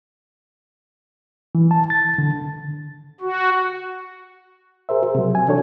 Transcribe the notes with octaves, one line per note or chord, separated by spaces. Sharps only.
E3
A5
A6
D3
F#4
G#4 A#4 C5 E5
F#4
C3 F#3
G#5
E3 D4 F#4 A4 C#5